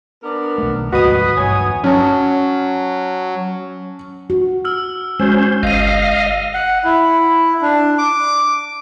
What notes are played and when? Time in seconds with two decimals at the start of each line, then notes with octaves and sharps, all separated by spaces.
0.23 B3 D4 A#4
0.58 B1 A3
0.92 D2 G#2 B2 F#4 B4 D#5 D#6
1.37 A1 G2 A3 C#5 G#5
1.84 F#3 C#4 A5
4.30 F#4
4.65 E6 F6
5.20 G#3 C#4 F#4 C5
5.63 G1 D#5 F5 C7 D#7
6.54 F#5
6.85 E4
7.62 D4
7.98 D6